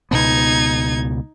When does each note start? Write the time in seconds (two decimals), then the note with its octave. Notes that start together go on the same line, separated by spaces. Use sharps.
0.11 C#2 B2 B3 D#4 G#6